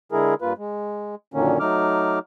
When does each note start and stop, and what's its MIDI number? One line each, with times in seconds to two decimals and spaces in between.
0.12 0.34 50
0.12 0.34 56
0.12 0.34 64
0.12 0.34 68
0.12 0.34 70
0.42 0.53 43
0.42 0.53 58
0.42 0.53 65
0.42 0.53 71
0.58 1.15 56
1.34 1.59 42
1.34 1.59 46
1.34 1.59 50
1.34 1.59 51
1.34 1.59 58
1.34 1.59 61
1.60 2.19 54
1.60 2.19 57
1.60 2.19 63
1.60 2.19 86
1.60 2.19 89